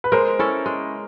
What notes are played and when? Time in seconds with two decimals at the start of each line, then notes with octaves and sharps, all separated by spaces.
0.04 B4
0.12 G#3 A#4 C5
0.39 C#4 E4 A4
0.66 G#3